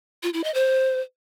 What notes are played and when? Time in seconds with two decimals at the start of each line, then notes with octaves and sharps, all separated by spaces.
0.23 F4
0.33 E4
0.44 D#5
0.54 C5